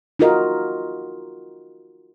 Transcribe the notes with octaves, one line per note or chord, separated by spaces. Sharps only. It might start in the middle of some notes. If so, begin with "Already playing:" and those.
D#4 F4 F#4 A#4 D#5